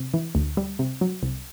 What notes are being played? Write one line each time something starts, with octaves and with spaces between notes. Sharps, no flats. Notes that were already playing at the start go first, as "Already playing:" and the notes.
Already playing: C3
E3
D2
G3
C3
F#3
C2